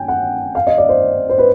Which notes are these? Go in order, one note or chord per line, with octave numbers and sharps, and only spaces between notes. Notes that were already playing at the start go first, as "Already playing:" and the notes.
Already playing: G5 G#5
F#5
F5
D#5
D5
C5
C5
B4